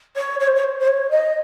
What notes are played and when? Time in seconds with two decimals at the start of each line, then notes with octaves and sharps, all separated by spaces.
0.17 C#5
0.40 C#5
0.47 C5
0.55 C#5
0.64 C5
0.80 C5
0.88 C#5
1.11 D#5